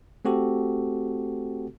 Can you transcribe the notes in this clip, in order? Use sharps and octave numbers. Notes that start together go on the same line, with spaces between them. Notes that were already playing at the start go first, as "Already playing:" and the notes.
A3 C4 F#4 G4 A4